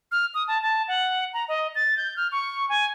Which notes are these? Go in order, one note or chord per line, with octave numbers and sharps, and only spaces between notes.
F6
D#6
A5
A5
F#5
A#5
D#5
A6
G6
F6
C#6
G#5